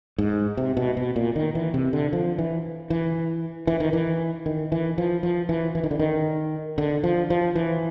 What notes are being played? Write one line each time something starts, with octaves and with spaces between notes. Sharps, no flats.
G#2
C3
B2
B2
A#2
D#3
E3
C3
D3
F3
E3
E3
E3
D#3
E3
D#3
E3
F3
F3
E3
E3
D#3
D3
D#3
D3
F3
F3
E3